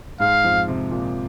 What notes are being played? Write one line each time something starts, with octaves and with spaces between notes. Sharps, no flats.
G#2 G#3 F5
F2 F3
C3
A#2